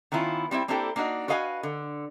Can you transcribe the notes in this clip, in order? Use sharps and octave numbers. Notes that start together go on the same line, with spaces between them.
D#3 B3 C#4 E4 F4
G3 C4 C#4 E4
A#3 C4 D4 E4 G4 A4
A#3 D4 D#4 F#4
F#4 B4 D#5 F5 F#5 G#5
D3